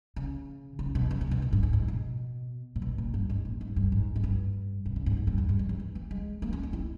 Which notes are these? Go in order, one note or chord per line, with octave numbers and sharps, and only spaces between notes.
C#3
C#3
B2
C#3
C#3
B2
A#2
G2
G#2
G#2
B2
A#2
B2
A#2
G2
G#2
A#2
G#2
G2
G#2
G#2
G2
B2
C#3
G#2
G#2
G2
E2
G2
G#2
D#3
E3
E3
G#3
A#3
C#4
D#4
E4